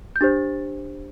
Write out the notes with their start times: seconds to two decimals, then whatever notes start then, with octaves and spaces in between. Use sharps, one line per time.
0.16 G6
0.21 D4 G4 C5 A6